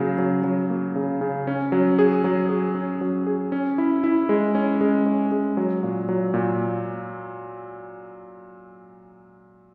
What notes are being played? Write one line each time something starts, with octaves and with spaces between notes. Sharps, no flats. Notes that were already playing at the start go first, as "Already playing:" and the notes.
Already playing: C#3 F#3 A#3
F#3
F#3
A#3
C#3
C#3
C#4
F#3
G#4
F#3
G#4
C#4
F#3
G#4
C#4
E4
E4
G#3
C#4
G#3
C#4
G#3
F#3
A#2
F#3
A#2